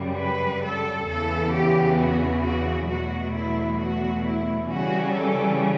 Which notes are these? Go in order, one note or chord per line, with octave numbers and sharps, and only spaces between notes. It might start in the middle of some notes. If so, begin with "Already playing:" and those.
Already playing: F#2 C#3 G3
B4
A4
E2 C#3 E3 B3 A4
G4
F#4
F#4
E2 B2 F#3 A3 F#4
E4
F#4
E4
C#3 E3 G3 C#4 F#4
A4